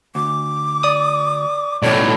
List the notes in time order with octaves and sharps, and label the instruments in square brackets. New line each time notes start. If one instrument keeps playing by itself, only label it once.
[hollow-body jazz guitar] D2 [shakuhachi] D6
[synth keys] D5 D#6
[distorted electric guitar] B1 A2 [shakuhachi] C#5 [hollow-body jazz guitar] D5